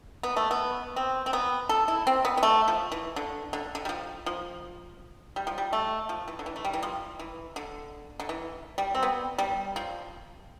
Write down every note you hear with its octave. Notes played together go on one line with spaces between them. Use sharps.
B3
A3
B3
C4
C4
B3
A4
E4
C4
B3
B3
A3
F3
E3
D3
D3
D3
G3
F3
F3
G3
F3
G3
A3
F3
E3
D3
E3
A3
G3
E3
F3
E3
D3
D3
E3
G3
C4
B3
G3
F3